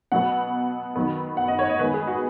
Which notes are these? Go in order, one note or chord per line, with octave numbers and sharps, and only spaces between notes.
B2 F#3 B3 F#5
D#3 F#3 B3
F#5
D#5
C#5
D#5
D#3 G#3 B3 B4
G#4
F#4